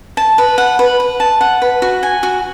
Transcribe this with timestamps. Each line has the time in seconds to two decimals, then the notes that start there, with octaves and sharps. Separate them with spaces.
0.17 A5
0.38 B4
0.58 F#5
0.79 B4
1.00 B4
1.20 A5
1.41 F#5
1.62 B4
1.82 F#4
2.03 G#5
2.23 F#4